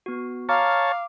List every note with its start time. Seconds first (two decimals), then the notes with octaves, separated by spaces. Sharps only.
0.06 B3 F#4
0.49 C#5 F5 A5 A#5 D6 F6
0.91 D6